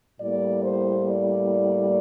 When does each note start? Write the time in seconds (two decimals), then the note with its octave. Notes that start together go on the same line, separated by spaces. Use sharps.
0.20 A2 G3 A#3 D5
0.64 C5
1.06 D5